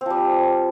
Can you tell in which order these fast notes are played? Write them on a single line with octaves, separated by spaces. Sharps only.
C4 F3 G3